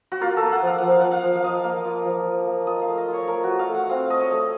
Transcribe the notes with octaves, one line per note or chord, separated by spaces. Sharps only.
F#4
A#3 F4
A4
A#3
F#5
F3
F5
F3 F#5
F5
F3 F#5
F5
F3
F5
F3 D#5
A#3
F4
F3
F3
A#3
F4 D#5
F5
A3
D#5
F4
C#5
A3 A#4
F#4
F4
F5
A3
F#5
C4 F5
A3 D#5
C#5
A3